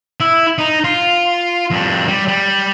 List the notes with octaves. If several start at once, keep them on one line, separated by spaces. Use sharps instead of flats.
E4
D#4
F4
F2 G3
G3
G3